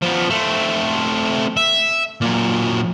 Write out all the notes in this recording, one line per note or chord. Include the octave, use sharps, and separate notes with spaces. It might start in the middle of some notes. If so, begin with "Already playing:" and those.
F3 B3
A3 C4
E5
A#2 F#3